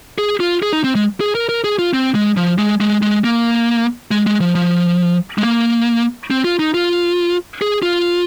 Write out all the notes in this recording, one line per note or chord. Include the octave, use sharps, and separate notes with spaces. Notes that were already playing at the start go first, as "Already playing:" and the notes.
G#4
F4
G#4
D#4
C4
G#3
G#4
A#4
A#4
G#4
F4
C4
G#3
F3
G#3
G#3
G#3
A#3
G#3
G#3
F3
F3
G#3
A#3
C4
F4
D#4
F4
G#4
F4